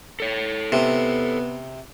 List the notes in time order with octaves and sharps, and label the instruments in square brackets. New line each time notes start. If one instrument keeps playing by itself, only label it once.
[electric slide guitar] A4 C#5
[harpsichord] C3 [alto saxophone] B3